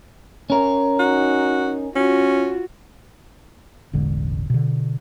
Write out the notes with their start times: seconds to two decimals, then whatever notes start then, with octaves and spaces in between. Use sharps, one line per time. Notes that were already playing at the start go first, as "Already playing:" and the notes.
0.50 C#4 A#4
0.99 D#4 F#4
1.96 C#4 F4 F#4
3.93 E1 A1 D3 G#3
4.50 B2 D3